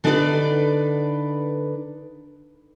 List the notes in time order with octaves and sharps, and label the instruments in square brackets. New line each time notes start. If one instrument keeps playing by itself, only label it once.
[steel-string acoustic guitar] D3 D4 D#4 A#4 B4 D5